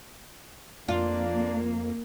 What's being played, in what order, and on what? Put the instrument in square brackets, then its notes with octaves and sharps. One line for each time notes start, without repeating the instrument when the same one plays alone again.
[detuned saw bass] F2 [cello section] A#3 [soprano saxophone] D4 [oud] F4